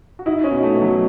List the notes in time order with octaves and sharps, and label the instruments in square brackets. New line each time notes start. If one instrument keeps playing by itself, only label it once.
[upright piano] F#4
[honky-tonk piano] D#4 [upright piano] E4
[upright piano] C#4
[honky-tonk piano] B2
[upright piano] A3
[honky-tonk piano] B2
[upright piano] F#3